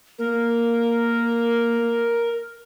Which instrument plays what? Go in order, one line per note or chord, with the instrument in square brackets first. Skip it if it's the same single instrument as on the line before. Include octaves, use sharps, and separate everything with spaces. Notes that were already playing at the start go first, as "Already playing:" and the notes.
[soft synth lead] A#3 [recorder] A#4